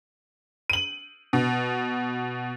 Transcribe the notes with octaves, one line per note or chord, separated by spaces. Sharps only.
D#7 F#7
B2